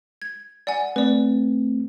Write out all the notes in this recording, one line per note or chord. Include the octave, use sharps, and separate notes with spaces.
G#6
D5 F#5 G#5
A3 C4 B4 D5